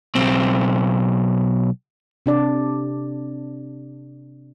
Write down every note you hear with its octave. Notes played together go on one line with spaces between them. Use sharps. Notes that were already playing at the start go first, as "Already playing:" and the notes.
B1 C4
C3 D4 D5